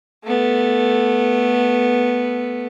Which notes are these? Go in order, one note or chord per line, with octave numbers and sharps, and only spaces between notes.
A3 B3